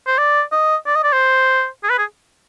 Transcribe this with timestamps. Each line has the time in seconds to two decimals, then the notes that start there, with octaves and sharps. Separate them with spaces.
0.07 C5
0.18 D5
0.52 D#5
0.86 D5
0.95 D#5
1.04 D5
1.13 C5
1.84 G#4
1.90 B4
1.98 G#4